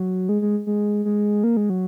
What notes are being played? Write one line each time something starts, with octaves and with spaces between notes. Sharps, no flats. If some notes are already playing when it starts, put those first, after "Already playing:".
Already playing: F#3
G#3
G#3
G#3
G#3
A#3
G#3
F#3